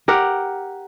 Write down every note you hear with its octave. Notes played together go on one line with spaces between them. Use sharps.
G4 A#4 F#5